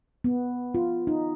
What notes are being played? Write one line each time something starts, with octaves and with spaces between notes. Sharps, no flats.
B3
F4
D#4